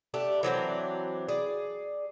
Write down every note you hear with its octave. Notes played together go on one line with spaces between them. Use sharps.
A3 D4 G4
E3 F#3 C4 D4
G#4 D5